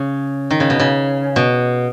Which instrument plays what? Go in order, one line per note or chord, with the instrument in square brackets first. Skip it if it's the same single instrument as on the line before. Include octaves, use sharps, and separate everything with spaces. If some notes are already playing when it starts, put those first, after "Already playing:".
Already playing: [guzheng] C#3
D#3
C#3
B2
C#3
B2